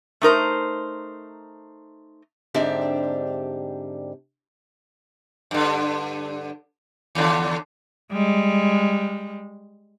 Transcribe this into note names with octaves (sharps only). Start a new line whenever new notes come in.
A3 D#4 A#4 C5
G#2 D3 C4 D4 G4 E5
G2 D3
D#2 D3
G3 G#3